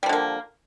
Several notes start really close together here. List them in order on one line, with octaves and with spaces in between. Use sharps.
G3 F3 D3 A#3